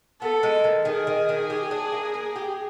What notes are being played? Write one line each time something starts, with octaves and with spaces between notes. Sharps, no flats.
B3 A4
G#3
D#3
D#3 G#4
D#3
D#3
G4
D4
A#3
A#3
G4